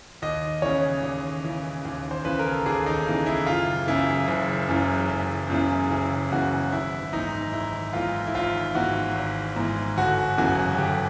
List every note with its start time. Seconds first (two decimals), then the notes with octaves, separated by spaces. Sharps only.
0.22 D#2 D#5
0.62 C#3 E3 C#5
1.03 D#2
1.45 C#3 E3
1.85 D#2
2.11 C5
2.25 C#3 E3 B4
2.39 A#4
2.52 A4
2.66 D#2 G#4
2.86 D#4
3.06 C#3 E3
3.26 E4
3.46 F#1 F4
3.87 F#2 C#3 E3 E4
4.28 F#1
4.69 F#2 C#3 E3
5.09 F#1
5.50 F#2 C#3 E3
5.91 F#1 E4
6.32 F#2 C#3 E3 F#4
6.71 G#1 E4
7.12 G#2 E3 D#4
7.53 G#1 E4
7.93 G#2 E3 F4
8.27 E4
8.34 G#1 F4
8.75 G#2 E3 F#4
9.15 G#1
9.56 G#2 E3
9.97 G1 F#4
10.37 F#2 C#3 E3 F#4
10.78 G1 G4